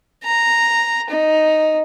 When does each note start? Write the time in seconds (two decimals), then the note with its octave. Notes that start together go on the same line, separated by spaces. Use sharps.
0.24 A#5
1.10 D#4